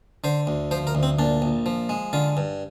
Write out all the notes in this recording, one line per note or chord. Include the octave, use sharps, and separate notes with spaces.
D3 C5
D2
F3 C5
A#4
D2
C4
A#2 D4
A#1
F3
G#3
D3 F4
G2